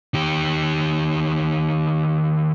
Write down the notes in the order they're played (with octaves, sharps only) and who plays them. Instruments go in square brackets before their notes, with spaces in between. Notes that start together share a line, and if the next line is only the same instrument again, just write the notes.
[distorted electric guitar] D#3 G4